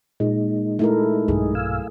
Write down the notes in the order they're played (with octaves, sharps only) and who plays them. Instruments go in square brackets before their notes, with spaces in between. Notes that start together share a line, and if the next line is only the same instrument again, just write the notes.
[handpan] A#2 [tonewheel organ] G#3 D#4
[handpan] A3 E4 A#4
[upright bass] B1 G2 [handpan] G#4
[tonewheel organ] F5 G#5 E6